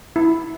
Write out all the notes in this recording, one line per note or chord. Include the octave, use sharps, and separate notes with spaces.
E4